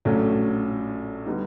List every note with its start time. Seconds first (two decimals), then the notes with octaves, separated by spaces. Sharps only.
0.05 A#1 A2 F#3 A3 C#4
1.26 D3 G3 B3 D#4